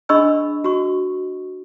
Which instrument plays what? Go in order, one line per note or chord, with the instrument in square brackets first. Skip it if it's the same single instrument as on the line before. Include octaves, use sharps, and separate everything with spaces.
[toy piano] D4 G#4 D#5 B5 C#6 E6
F#4 C#6